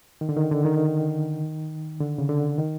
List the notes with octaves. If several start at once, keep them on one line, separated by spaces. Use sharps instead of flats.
D#3
D3
D#3
D3
D#3
D3
C#3
D3
D#3